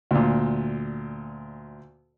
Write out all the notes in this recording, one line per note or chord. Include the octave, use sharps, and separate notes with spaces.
D2 A#2